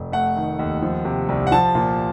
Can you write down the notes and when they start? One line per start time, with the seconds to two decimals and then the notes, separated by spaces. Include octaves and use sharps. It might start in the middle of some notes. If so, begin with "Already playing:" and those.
Already playing: F1
0.12 A3 F#5
0.36 D#3
0.59 D#2
0.82 F3
1.05 C3
1.29 C2
1.47 F#5
1.52 F3 A5
1.75 A#2